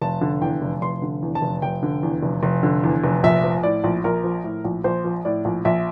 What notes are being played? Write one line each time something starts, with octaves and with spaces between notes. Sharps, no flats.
F1 A5
D3
E2 G5
F1
F1 C6
D3
E2
A5
F1
F1 G5
D3
E2
F1
F1
D3
E2
F1
A#1 E5
F3
A2 D5
A#1
A#1 A#4
F3
A2
A#1
A#1 C5
F3
A2 D5
A#1
A#1 E5